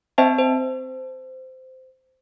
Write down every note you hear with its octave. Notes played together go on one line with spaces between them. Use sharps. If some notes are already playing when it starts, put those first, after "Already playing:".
C4 C5 D#5 E5 G5 A5
C5